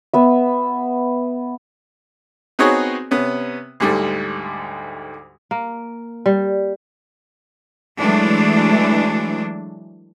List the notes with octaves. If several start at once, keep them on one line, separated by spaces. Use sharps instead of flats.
B3 E5
B3 C4 D#4 F#4 G#4 C#5
C3 B3 C#4
D2 G#2 G3 A3
A#3
G3
E3 F#3 G#3 A3 D4